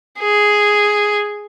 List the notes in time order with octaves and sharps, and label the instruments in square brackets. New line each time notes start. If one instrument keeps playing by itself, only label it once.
[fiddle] G#4